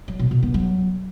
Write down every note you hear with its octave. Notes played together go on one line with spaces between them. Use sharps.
F#3
B2
B2
B3
F#3